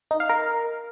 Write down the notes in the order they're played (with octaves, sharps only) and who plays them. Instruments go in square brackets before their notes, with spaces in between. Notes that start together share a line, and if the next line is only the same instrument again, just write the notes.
[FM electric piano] D#4
F5
A#4